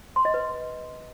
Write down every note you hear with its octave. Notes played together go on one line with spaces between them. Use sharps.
C6
D#5
B4